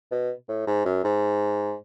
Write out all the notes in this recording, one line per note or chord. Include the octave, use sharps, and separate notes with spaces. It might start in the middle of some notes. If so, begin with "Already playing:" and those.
B2
A2
G#2
F#2
G#2